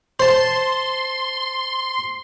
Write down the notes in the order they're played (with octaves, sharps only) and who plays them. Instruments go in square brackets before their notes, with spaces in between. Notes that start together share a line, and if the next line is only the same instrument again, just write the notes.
[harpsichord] C5 A5 [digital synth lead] C6